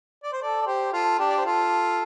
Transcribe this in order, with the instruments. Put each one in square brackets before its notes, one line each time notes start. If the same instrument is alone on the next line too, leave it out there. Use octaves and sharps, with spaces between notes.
[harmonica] D5
C5
A4 D5
D5
G4 C5
F4 A4
D4 G4
D5
C5
F4 A4